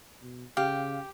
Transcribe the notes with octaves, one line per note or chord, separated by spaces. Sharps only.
B2
C#3 G4 F5 G5